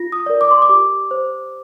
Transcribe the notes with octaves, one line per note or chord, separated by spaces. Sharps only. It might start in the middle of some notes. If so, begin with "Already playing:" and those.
Already playing: F4 A#6
D#6
A#4 D5
D6
C6
D6
G4
C5